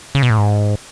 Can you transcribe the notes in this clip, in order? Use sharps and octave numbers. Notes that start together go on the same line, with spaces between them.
C#3
B2
A2
G#2